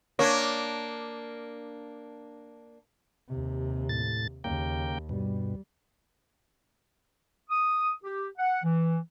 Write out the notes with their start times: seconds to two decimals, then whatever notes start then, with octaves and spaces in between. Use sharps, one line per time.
0.19 A#3 D4 C#5
3.28 D#2 C3
3.89 A2 A6
4.44 D#2 C#3 A#3 G5
5.09 G2 B2 G3
7.49 D#6
8.03 G4
8.38 F#5
8.64 E3